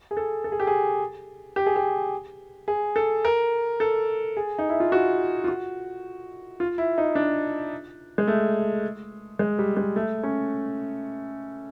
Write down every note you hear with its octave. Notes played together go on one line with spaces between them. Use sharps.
G#4
A4
A4
G#4
G4
G#4
G4
G#4
G4
G#4
A4
A#4
A4
G#4
D#4
E4
F4
F#4
F4
F#4
F4
E4
D#4
D4
G#3
A3
G#3
G3
G#3
A3
C#4